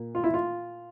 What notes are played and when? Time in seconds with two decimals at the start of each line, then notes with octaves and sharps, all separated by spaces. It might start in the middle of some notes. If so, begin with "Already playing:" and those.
Already playing: A#2 A#3
0.15 F4
0.24 E4
0.34 F4